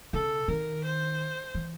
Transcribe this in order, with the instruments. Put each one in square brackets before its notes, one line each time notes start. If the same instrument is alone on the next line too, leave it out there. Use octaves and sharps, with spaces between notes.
[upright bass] C#3 [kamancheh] A4
[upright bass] D#3 [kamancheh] A#4
[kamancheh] C5
[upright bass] E3